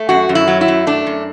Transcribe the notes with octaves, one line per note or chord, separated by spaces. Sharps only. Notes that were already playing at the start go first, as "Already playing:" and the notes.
Already playing: A3
F#2 F#4
F#2
E4
F#3
E4
F#2
A3 D4
F#2